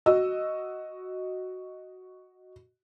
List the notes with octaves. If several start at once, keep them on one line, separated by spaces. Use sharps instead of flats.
F#4 D#5 E6